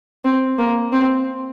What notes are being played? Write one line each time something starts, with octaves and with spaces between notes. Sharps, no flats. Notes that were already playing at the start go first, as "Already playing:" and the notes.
C4
A#3
C4